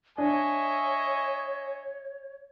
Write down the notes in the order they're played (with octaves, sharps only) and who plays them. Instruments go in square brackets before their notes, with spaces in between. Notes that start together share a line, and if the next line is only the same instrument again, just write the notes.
[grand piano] D4 [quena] C#5 [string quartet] D#5 E5 C#6 [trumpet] G#5